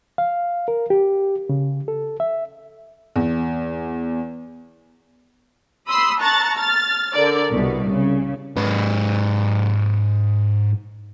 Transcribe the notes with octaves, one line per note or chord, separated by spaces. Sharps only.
F5
A#4
G4
C#3
A4
E5
E2
B5 C6 D#6 E6 C7
A5 A#5 C#6 F#6 A6
F6 A6
D3 A#4 D5
C2 B2
C#3
G#2 B4